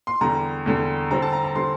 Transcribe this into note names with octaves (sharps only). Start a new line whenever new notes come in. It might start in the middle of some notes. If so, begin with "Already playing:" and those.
C6
E2 D3 G3 A#5
E2 D3 G3
D3 G3 C4 A#5
A5
A#5
A#5
D3 G3 C4 C6